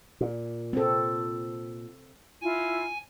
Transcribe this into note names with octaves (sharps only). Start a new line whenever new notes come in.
A#2
C4 A4
E4 F4 G#5